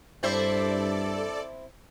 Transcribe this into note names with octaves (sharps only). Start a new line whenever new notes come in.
G2 C4 E4 A4 C5 D5